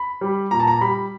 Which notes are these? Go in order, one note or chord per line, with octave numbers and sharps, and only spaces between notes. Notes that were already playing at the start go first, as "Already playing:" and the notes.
Already playing: B5
G3
A#2 A#5
A5
A#5
G3 B5